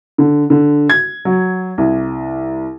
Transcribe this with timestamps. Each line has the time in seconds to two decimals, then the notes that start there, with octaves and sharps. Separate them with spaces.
0.18 D3
0.50 D3
0.89 G#6
1.25 F#3
1.78 C2